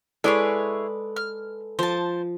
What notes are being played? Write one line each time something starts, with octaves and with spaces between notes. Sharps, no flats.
G#3 E4 G#4 A4 B4 C#5 D5
F6
F3 C5 A5